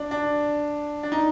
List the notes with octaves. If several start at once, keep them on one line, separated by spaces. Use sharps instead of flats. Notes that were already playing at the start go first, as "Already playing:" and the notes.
Already playing: D4
D4
D4
D#4